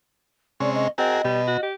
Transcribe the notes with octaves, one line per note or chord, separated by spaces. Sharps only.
C3 G#3 C#4 D5
D#5
C4 F#4 G#4 A#4 D#5
B2 G3
F#4
G4